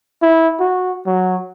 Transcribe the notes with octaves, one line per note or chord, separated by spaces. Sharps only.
E4
F#4
F#3